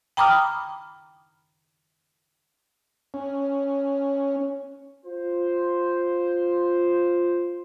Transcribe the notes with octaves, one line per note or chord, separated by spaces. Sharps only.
G5 A#5 B5 D6 D#6 F6
C#4
F4 C5